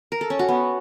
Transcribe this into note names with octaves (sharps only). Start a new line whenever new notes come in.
A#4
A4
C#4
F#4
B3